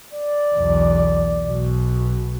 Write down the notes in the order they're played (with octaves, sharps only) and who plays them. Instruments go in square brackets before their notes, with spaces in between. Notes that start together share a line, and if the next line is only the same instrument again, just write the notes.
[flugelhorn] D5
[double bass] B1 E2
B1 B2